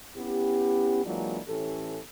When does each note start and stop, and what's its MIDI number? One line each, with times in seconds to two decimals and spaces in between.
0.17 1.04 59
0.17 1.04 61
0.17 1.04 64
0.17 1.04 67
1.05 1.39 52
1.05 1.39 54
1.05 1.39 56
1.05 1.39 58
1.05 1.39 62
1.05 1.39 65
1.48 1.98 45
1.48 1.98 52
1.48 1.98 61
1.48 1.98 67
1.48 1.98 69